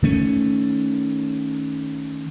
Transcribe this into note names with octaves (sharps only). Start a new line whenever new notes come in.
D#3 A3 C#4